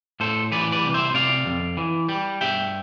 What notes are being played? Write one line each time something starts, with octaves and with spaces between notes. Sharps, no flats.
A2 A4 C5
E3 B4 D5
B4 D5
C2
C5 E5
C3 D5 F5
F2
E3
G3
G2 E5 G5